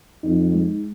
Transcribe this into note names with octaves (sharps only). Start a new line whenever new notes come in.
F2 D#4
G#3